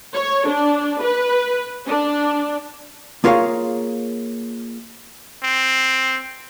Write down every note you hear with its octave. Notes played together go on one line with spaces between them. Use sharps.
C#5
D4
B4
D4
A#3 F4 G#4 A#4 C#5 F5
C4